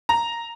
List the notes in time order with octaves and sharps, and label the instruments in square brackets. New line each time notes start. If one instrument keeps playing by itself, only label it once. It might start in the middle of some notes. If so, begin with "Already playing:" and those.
[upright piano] A#5